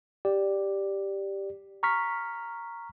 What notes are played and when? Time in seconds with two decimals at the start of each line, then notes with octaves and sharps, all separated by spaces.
0.25 G4 D5
1.83 A#5 C#6 F6 B6